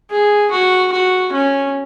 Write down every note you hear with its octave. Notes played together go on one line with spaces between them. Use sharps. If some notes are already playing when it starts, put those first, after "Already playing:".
G#4
F#4
F#4
C#4